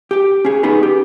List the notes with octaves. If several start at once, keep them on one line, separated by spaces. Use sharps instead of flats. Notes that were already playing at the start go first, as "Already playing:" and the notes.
G4 G5
C#4 G#4
B3 C#4 D#4 G#4 B4
G4